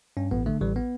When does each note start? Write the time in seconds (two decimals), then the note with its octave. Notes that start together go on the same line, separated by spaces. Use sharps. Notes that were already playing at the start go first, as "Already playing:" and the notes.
0.17 G2 C#4
0.31 A1 B3
0.46 D3 A3
0.61 A1 G3
0.76 B3